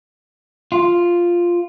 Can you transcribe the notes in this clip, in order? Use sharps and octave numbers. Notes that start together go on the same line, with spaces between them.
F4